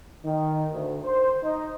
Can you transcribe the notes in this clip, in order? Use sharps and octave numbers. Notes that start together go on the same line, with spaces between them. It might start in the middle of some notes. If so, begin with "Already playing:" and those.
D#3
D2
C5
D#4